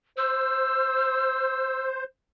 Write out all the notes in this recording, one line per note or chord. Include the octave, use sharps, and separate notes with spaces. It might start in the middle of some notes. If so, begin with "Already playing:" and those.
C5 E6